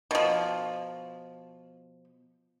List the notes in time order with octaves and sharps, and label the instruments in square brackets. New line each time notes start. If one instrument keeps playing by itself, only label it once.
[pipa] B2 F3